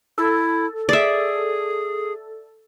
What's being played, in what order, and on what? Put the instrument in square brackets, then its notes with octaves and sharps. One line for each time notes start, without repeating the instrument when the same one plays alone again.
[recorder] E4 [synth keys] A4
[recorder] G#4 [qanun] D5 E5